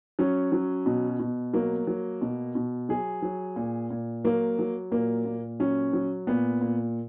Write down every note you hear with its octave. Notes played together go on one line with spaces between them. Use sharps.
F#3 C#4
F#3
B2
B2
F#3 A#3
F#3
B2
B2
F#3 G#4
F#3
A#2
A#2
F#3 A#3
F#3
A#2 A#3
A#2
F#3 C#4
F#3
A#2 B3
A#2